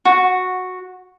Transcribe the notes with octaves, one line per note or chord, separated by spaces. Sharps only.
F#4